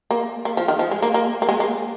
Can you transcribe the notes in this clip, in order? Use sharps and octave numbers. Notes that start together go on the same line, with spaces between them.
A#3
A#3
F3
D#3
F3
G#3
A#3
A#3
A#3
G#3
A#3